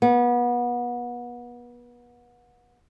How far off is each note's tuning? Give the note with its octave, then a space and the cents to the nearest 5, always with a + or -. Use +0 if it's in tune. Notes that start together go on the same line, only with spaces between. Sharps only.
B3 -30